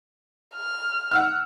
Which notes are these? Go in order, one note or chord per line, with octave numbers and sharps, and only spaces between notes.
F6
F#5 E6 F6